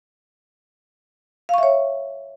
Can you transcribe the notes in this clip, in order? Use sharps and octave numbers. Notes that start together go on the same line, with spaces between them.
C#5 E5 F5 C#6